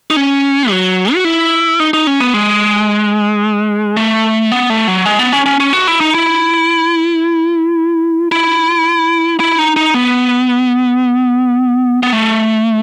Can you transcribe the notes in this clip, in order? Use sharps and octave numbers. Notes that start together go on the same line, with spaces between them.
D#4
C#4
F#3
F#4
E4
D#4
D#4
C#4
B3
G#3
A3
B3
A3
F#3
G#3
B3
C#4
C#4
C#4
F#4
E4
D#4
E4
E4
E4
D#4
D#4
B3
B3
A3